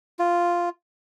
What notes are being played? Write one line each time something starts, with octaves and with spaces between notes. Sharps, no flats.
F4